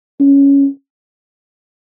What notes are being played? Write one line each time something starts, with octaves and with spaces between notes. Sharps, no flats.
C#4